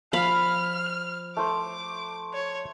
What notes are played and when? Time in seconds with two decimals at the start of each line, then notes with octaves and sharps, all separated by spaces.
0.13 F3 F5 B5 F6
1.37 A3 C5 D6
2.33 C#5